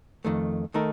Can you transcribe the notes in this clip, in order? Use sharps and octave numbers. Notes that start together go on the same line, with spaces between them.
F2 D#3 A3
D#3 A3 D#4 A#4